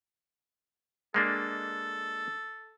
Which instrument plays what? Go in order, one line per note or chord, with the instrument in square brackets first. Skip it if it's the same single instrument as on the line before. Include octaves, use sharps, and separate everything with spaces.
[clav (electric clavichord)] G#3 A#3 D4 [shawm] A4